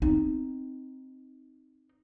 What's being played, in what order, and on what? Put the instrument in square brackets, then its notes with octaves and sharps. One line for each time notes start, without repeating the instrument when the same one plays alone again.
[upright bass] C4 D#4